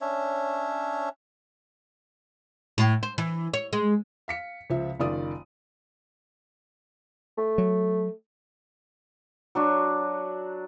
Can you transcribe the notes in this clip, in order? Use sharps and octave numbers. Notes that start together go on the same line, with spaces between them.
C#4 D4 C#5 E5
A2
C5
E3
C#5
G#3
F5 B6 C#7
C#2 F3 E5
F#1 D#3 F4 D5 D#6
A3
F#3
F#3 D4 F#4